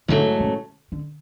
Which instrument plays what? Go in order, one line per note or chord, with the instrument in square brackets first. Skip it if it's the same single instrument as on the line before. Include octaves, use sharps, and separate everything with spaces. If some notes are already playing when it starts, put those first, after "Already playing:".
[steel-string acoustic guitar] G#2 F#3 A3 [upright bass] D3
[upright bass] C#3
D3